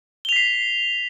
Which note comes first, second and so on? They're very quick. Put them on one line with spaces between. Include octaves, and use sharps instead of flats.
G7 F7 B6 C7